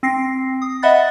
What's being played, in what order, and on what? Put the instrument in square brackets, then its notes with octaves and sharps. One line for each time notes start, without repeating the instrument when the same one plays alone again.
[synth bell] C4 A#6 C7
D#6
D#5 E5 F#5 B5 F#6 A6